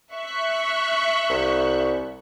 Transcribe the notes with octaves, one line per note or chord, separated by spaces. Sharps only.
E5 C#6 F#6
C2